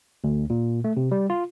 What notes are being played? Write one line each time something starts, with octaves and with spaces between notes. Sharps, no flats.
D2
A#2
A3
C3
G3
F4